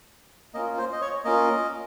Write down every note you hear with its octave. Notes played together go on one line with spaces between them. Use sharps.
A#3 C#4 F4 D#5
C5
D#5
C#5
A#3 C#4 F4 D#5